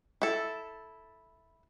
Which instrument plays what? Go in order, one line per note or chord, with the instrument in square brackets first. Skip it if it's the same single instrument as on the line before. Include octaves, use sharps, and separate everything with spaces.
[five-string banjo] E4 A4